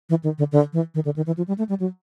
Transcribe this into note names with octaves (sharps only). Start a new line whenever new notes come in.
E3
D#3
D3
D3
E3
D#3
D3
D#3
E3
F3
G3
A3
G3
F#3